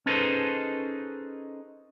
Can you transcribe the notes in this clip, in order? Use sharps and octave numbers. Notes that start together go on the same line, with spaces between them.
C#4 D#4 G#4 A4 B4 C5